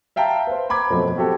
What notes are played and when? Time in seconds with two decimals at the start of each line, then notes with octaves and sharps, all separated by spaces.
0.16 E5 F5 G5 A5 A#5
0.47 B4 C5
0.70 A#5 B5 D6 G#6
0.90 F#2 B2 F3 F#3 A3 C4
1.17 C4 F#4 G4 A4